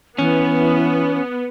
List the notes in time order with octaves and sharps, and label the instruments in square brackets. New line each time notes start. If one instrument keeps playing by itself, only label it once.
[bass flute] E3 [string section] B3 [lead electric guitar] C#4